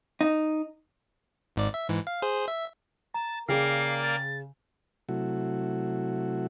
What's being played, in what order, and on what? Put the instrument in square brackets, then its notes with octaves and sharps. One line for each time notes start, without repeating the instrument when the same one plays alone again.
[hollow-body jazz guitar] D#4
[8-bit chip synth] G#1 G#2 D5
E5
G#2 E3
F5
G#4 C5
E5
[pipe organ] A5 [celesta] A#5
[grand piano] C#3 [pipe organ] A#3 A#4 D5 [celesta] G#4 G5 F6 [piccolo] C7
[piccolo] A6
[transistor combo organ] C3 F#3 A3 E4 F#4